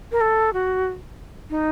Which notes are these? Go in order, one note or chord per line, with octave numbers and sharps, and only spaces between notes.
A#4
A4
F#4
D#4